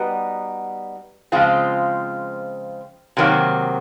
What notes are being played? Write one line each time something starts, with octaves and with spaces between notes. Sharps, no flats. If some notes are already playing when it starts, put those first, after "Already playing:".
Already playing: G3 B3 D#4 F#4
C#3 F3 G#3 C4 F4
C3 D#3 F#3 A#3